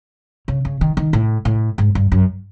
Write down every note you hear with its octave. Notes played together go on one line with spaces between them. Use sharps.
C#3
C#3
D#3
D#3
A2
A2
G#2
G2
F#2